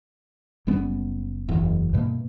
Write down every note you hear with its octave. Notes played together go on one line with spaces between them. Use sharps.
F#1 G3 B3 C#4
F#1 E2
G2 B2 A3 A#3